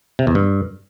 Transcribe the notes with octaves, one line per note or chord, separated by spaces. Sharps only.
C3
E2
G2